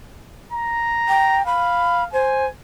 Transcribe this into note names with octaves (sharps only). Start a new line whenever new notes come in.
A#5
G5
F5 B5
C5 G#5